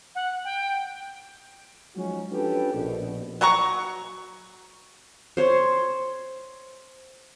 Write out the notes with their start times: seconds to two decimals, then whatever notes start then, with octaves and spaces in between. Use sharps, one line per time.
0.15 F#5
0.44 G5
1.96 F3 F#3 G#3 C#4 D#4 F#4
2.32 C#4 D4 F4 G4 A4 B4
2.75 A#1 B2
3.41 F#3 F#5 A#5 C#6
5.37 C5 C#5